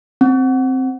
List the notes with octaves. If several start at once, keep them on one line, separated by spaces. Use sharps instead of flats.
C4